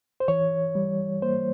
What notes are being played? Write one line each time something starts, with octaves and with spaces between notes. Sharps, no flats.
C5
E3 C#5
G3
A#3 C5